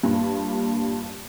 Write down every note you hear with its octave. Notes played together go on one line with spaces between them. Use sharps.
G2 A#2